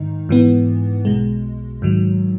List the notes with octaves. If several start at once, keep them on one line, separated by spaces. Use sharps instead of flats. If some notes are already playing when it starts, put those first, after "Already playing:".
Already playing: G#2 D#3 D#4
G#2 E3 B3
B1 B2 G#3
G#2 D#3 F#3